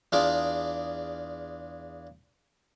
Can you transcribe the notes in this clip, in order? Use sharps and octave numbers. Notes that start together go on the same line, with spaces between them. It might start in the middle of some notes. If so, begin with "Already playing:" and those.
E2 D4 F4 G#4 D5